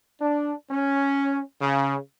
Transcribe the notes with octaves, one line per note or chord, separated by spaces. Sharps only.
D4
C#4
C#3